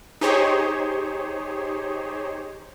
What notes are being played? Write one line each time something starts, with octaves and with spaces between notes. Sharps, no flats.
D#4 G4 G#4 C5 C#5